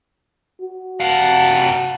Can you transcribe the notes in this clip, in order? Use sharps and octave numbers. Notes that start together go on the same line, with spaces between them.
F#4
C3 F5 F#5 A5